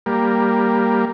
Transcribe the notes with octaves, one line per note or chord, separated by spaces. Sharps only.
G3 A#3